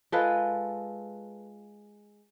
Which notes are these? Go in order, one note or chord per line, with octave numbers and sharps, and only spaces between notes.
G#3 F4 A4 B4